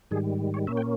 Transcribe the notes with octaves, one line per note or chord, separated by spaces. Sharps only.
G#2 D#3 G3 G#4
C#5
A#2 A#3 C#4 E5
G5